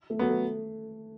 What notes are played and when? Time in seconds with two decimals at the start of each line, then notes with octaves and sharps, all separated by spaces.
0.10 A3
0.19 F#3 B3
0.30 A3